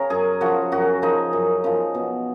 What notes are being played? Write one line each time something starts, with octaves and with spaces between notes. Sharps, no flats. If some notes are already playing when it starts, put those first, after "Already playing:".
Already playing: C#3 A#4 C#5
F#2 G#4
C#3 F3 F#4
F#2 F#4
C#3 F3 D#4
F#2
C#3 F3
B2